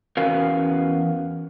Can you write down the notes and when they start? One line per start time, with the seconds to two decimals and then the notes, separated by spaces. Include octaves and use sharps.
0.17 E2 C#4 F#4 A#4 B4 F5